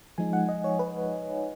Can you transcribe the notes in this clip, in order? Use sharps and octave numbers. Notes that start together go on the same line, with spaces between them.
F3 G#3 D#4 G#5
F#5
D#5
C#5
B4